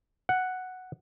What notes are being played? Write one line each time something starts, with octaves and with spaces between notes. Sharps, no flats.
F#5